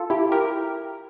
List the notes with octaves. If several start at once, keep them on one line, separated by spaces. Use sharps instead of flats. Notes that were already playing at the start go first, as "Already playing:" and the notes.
Already playing: F4 A4
E4 G4
G4 A#4